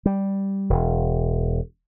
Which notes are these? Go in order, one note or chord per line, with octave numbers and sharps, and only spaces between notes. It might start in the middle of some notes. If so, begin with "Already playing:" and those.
G3
E1